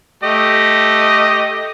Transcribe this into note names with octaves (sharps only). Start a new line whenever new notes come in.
A3 G4 D#5